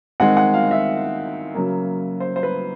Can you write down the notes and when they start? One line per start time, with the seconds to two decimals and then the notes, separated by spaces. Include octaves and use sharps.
0.20 D#3 G#3 C4 F#5
0.37 F#5
0.54 F5
0.71 E5
1.54 C#3 F#3 A#3
2.20 C5
2.36 C5
2.43 B4